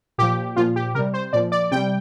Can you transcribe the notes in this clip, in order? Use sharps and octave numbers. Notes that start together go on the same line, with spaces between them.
A#2 F3 G4
A#2 F3 F4
G4
C3 G3 A#4
C5
A#2 F3 D5
D5
C3 G3 G5